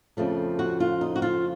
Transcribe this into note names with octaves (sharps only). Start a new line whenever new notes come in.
F2 C#3 F3 A3
F#4
F4
D#4
F#4
F4